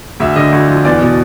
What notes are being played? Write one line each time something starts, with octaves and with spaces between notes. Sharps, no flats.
D2 E5
D3 D#5
D2
F3
E2 D5
B2